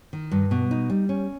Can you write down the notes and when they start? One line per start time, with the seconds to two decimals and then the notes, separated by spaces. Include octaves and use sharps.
0.13 D#3
0.31 G2
0.51 B2
0.71 D#4
0.90 G3
1.09 C#4